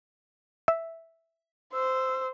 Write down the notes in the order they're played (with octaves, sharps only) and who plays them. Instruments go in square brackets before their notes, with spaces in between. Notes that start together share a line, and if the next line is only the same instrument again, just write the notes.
[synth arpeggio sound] E5
[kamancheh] C5 [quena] E6